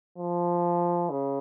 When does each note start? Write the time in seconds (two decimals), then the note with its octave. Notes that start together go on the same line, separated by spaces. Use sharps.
0.18 F3
1.10 C#3